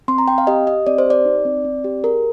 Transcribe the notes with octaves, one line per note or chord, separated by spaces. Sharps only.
C4 C6
A#5
C4 G5
F5
G4 D#5
G4 D#5
C4 D5
C5
G4 D5
D#4
C4
C4
G4
G#4 A#4